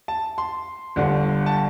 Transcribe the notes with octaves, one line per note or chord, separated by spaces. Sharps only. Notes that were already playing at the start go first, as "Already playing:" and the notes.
A5
C6
G1 G2 D3
A5